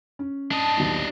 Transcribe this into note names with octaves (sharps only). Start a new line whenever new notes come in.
C#4
D4 D#5 A5
D#1 B1